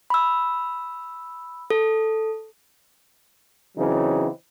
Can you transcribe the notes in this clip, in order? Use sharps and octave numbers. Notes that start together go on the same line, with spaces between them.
B5 E6
A4
C#3 E3 F#3 C4 D#4